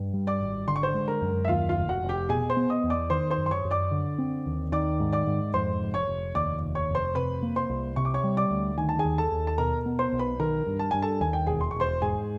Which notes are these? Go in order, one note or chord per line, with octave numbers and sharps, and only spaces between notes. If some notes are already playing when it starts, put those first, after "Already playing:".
Already playing: G2
G3
D5 D6
G#1
D3 C6
C#6
C5 C6
G#3
A#4 A#5
F#2
E5
D#2 F4 F5
F4 F5
F1
F#4 F#5
F1
G4 G5
B2 G#4 G#5
C5 C6
B3
D#5 D#6
E2
D5 D6
D#3 C5 C6
C5 C6
F#2
C6
C#5 C#6
F#2
D5 D6
D3
C4
D#2
D#3 D5 D6
G#2
D5 D6
G#2
F2 C5 C6
F1
C#5 C#6
F1
D#2 D5 D6
F1
C#5 C#6
F1
C5 C6
C3 B4 B5
A#3
C5 C6
C2
C3 C#6
D6
C#5 C#6
G3
D5 D6
D2
D#3 G#5
A5
G#4 G#5
D#2
A4 A5
D#2
A5
B2 A#4 A#5
B3
C5 C6
B1
B4 B5
D#3 A#4 A#5
G2
A5
G2 G#5
A4 A5
D#2 G#5
G5
E1 G#4 G#5
C6
E1 C#6
C5 C6
G#2 G#4 G#5